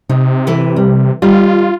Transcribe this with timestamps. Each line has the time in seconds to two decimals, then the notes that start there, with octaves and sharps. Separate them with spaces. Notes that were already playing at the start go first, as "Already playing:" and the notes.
0.09 C3 D#4
0.47 E3 A4 B4
0.76 G3
1.22 G3 D#4 F4